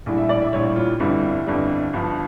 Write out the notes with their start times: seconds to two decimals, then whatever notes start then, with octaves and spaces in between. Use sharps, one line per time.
0.06 A#1 A2 E3 G3
0.18 E5
0.29 D5
0.42 E5
0.53 A#1 A2 E3 G3 C#5
0.76 F4
0.99 G1 F2 D3 G3 E4
1.47 G1 F2 D3 G3
1.93 G1 G2 F3